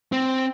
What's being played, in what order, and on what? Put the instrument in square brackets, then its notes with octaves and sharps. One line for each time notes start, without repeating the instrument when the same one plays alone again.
[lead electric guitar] C4